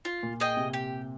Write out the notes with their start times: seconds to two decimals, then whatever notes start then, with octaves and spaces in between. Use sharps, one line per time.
0.05 F4
0.23 A#2
0.40 G#4 D#5 G5
0.57 C3
0.73 G4